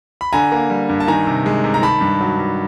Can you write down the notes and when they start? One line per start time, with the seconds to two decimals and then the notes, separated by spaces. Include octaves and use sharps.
0.21 B5
0.33 D3 G#5 A#5
0.52 A#3
0.70 G3
0.89 G2
1.00 A5
1.07 D#3 G#5 A#5
1.27 C3
1.46 G#3
1.64 C3
1.74 A#5
1.82 D#3 A5 B5
2.01 G2
2.21 F#3
2.39 G2